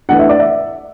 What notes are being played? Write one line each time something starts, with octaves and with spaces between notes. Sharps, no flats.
E3 A3 D4 F#5
E5
D5
E5